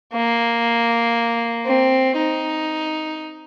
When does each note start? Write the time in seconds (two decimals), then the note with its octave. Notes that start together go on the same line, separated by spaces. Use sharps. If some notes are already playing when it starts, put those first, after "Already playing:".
0.13 A#3
1.66 C4
2.17 D#4